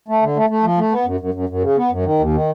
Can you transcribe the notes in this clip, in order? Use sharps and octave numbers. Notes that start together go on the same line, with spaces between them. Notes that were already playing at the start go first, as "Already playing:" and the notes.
A3
D3
A3
A3
F3
A3
B3
F#2
F#2
F#2
F#2
C#3
B3
F#2
D#3
D#2
D#3